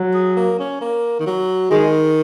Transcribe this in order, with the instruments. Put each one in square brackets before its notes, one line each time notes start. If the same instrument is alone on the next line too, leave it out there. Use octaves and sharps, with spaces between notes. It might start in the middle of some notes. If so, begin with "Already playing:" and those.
Already playing: [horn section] F#3
[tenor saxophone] G#4
A#3
C#4
A#3
D#3
F#3
[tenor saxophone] D#3 [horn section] G#3